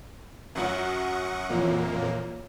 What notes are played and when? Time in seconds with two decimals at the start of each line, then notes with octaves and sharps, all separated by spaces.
0.55 F#2 F#3 F#4 F#5 C#6 D#6
1.49 F2 A#2 E3 A#3 F4 C#5